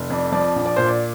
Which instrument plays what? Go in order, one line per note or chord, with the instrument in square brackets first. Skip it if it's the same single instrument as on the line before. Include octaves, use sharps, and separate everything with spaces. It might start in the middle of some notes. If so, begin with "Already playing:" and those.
Already playing: [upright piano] F1
F2 D5
F3 D5
A#1
D5
A#2 C5
D5